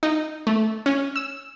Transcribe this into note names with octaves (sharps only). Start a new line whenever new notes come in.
D#4
A3
C#4
E6